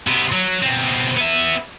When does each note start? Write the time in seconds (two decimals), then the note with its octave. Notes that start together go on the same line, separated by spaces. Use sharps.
0.07 C3 B3
0.32 F#3
0.62 B2 C4
1.17 B3 E5